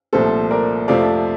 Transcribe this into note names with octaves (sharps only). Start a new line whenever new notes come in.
C2 A#2 F3 A3 A4 C5
A#4 D5
F2 C3 F3 A3 D5 F5